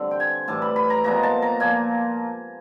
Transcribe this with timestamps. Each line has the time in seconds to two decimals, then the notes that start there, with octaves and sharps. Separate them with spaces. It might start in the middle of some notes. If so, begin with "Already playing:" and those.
Already playing: D3 G3 C4
0.11 G5
0.20 G#5
0.48 A2 E3 G3 A5
0.62 B5
0.76 B5
0.90 A#5
1.04 A#2 F3 G#3 B3 A#5
1.23 A5
1.42 A#5
1.60 A#2 F3 A#3 G#5